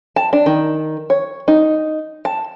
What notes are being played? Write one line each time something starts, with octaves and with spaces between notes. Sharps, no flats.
A5
D4
D#3
C#5
D#4
A5